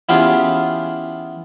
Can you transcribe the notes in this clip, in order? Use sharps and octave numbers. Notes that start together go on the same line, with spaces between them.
E3 B3 C#4 F4 G4 G#4